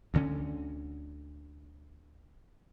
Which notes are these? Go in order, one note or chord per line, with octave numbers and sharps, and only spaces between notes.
D2 D3 C#4